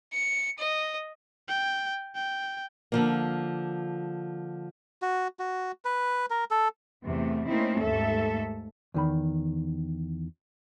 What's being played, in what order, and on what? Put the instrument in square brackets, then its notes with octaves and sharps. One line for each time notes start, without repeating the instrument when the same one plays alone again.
[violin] C#7
D#5
[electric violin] G5
G5
[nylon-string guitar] D3 F3 A#3
[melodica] F#4
F#4
B4
A#4
A4
[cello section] E2 C3 A3
A3 A#3 C4 C#4 D#4 E4
D#2 G#2 A3 A4 E5
[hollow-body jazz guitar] E2 D#3 B5